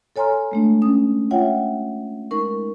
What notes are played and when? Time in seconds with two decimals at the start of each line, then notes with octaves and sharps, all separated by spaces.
0.16 A4 C#5 G#5 A#5 C6 F6
0.52 G#3 A3 D4
0.82 C#4 D#6
1.31 F4 C#5 E5 F#5 G5
2.31 G#3 D#4 A#4 C#6